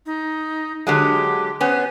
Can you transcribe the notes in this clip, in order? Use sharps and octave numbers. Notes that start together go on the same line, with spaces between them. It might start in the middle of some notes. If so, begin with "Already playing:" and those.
D#4
D3 F#3 G#3 G4
B3 C#4 C5